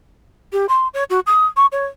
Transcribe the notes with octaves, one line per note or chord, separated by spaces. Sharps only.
G4
C6
C#5
F#4
D#6
C#6
C#5